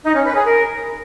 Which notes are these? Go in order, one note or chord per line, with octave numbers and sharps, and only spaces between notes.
D#4
C#4
B4
G#4
A#4